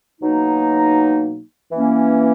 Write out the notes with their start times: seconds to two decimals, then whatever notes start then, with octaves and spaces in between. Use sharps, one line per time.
0.21 B2 F#3 A#3 D#4
1.72 E3 A#3 C#4